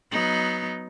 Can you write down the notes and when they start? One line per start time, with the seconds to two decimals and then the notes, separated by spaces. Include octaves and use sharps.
0.11 F#3 B3 D#4